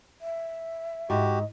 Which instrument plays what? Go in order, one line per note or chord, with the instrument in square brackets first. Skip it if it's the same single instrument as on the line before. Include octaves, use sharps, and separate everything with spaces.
[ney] E5
[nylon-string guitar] G#2 [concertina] F#4 G4 [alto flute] D#5